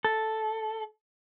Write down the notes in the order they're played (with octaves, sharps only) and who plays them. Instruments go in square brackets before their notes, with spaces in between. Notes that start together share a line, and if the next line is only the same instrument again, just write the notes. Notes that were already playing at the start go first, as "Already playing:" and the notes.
[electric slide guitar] A4